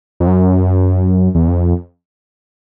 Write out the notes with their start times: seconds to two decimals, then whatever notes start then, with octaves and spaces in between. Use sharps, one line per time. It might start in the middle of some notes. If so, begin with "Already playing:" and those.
0.20 F2
0.27 F#2
1.35 E2
1.48 F2